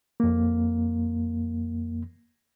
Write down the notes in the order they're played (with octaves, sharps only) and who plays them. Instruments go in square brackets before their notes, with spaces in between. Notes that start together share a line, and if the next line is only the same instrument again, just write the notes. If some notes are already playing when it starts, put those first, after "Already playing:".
[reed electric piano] F2 A#3